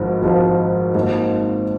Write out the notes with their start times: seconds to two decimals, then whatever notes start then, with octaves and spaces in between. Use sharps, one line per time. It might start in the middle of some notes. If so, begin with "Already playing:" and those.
Already playing: G#1 G#2 F3
0.22 G#1 G#2 F3
0.95 G#2 D#3 A#3 F4